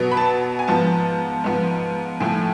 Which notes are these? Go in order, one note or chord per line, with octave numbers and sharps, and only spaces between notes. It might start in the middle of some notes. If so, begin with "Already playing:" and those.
Already playing: B2 F#3 B3
B5
A5
G#5
G#2 F3 B3 A5
G#2 F3 B3
A2 F3 A3 G#5